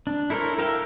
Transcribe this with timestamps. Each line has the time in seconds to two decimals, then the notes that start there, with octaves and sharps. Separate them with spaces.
0.07 D4
0.30 E4 A4 A#4 C5 C#5
0.59 A#4 E5 F5 G5